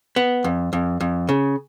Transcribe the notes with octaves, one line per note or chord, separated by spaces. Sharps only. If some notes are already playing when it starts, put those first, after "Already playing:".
B3
F2
F2
F2
C#3